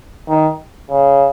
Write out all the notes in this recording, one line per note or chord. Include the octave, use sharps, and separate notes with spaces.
D#3
C#3